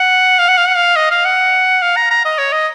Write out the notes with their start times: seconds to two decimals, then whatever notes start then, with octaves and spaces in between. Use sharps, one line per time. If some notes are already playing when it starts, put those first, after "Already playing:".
Already playing: F#5
0.39 F5
0.49 F#5
0.58 F5
0.67 F#5
0.76 F5
0.96 D#5
1.11 F5
1.25 F#5
1.82 F5
1.97 A#5
2.11 A#5
2.25 D#5
2.39 C#5
2.53 D#5